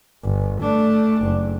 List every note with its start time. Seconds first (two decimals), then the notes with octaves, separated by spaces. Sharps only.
0.24 G1
0.62 A3 D4
1.23 F#1